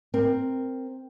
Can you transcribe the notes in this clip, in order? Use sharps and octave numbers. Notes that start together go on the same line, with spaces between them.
C4 A#4